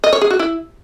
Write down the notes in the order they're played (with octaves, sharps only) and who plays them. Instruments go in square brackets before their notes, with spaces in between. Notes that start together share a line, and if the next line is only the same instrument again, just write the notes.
[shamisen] D#5
C#5
G#4
F#4
E4